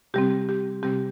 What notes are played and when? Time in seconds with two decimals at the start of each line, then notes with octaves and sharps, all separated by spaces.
0.14 C3 G3 C4 G4
0.49 G4
0.83 C3 G3 C4 G4